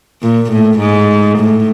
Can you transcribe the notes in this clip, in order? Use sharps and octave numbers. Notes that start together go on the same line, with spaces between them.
A#2
A2
G#2
A2